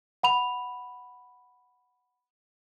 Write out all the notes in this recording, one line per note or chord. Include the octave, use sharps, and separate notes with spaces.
F#5 B5 F7